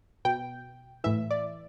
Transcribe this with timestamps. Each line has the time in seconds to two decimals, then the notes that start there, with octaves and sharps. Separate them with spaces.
0.25 B2 G5
1.04 A2 E3 E5
1.31 D5